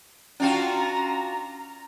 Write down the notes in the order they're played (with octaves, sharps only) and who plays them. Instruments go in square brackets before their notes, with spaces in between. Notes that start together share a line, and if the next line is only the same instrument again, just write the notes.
[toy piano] C#4 G5 [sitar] D4 F4 F#4 [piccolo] A#5